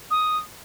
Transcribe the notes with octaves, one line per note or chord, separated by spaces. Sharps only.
D#6